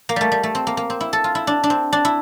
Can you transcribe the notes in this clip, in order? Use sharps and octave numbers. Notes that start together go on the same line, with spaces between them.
A#3
G3 A3
G3
A3
C4
A#3
A#3
C4
E4
A4
F4
E4
D4
D4
C4
D4
E4